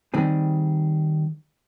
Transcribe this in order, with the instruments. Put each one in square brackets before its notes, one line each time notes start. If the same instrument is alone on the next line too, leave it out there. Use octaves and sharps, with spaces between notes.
[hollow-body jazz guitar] D#3 G3 C4 G#4